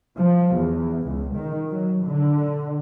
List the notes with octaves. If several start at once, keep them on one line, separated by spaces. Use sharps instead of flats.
F3
E2
C#2
D#3
F#3
D3